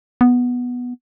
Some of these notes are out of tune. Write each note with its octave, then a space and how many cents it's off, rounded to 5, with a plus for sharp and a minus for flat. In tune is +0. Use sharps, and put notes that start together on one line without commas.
B3 -5